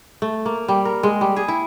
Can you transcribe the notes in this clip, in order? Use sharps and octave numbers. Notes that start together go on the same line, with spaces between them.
A3
A#3
G3
A#4
G#3
G3
G#4
E4